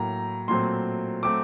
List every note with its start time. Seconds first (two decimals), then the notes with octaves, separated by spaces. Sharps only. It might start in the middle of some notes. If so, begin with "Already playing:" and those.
Already playing: A2 F#3 A#3 A#5
0.48 A#2 F#3 A3 C4 C6
1.23 F#3 A3 C4 D6